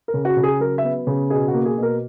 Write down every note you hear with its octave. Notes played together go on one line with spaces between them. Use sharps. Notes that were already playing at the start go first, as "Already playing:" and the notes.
A#4
C#3
F#4
C#3
G#4
F#3 A#4
E5
B3
C#3
B2 G#4
F#4
A#3
G#4
B2 A#4